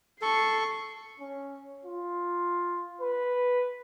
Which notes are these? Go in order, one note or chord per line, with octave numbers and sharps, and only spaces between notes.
A4 C#6 C7
C#4
F4
B4